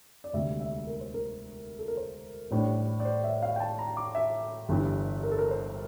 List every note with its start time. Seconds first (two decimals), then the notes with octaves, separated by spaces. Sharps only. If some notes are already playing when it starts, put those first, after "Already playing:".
0.24 D5
0.33 E1 D2 C3 G3 E5
0.60 E5
0.87 A#4
1.01 C5
1.14 A#4
1.79 A4
1.88 A#4
1.97 C5
2.51 A1 A2 G3 D4 C5
3.00 D5
3.05 C5
3.24 E5
3.43 F5
3.56 G5
3.60 A5
3.79 A#5
3.97 D6
4.15 E5
4.69 G1 G2 E3
5.23 A#4
5.32 A4
5.38 A#4
5.51 C5